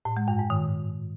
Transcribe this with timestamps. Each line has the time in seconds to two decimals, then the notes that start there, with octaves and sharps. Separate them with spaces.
0.05 A2
0.17 G#3
0.28 G2
0.39 G#2
0.50 D#3